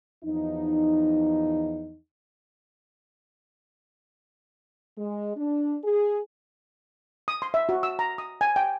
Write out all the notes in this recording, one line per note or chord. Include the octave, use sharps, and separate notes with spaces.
E2 F3 D#4
G#3
D4
G#4
D#6
C6
E5
F#4
E6
A#5
D#6
G#5
G5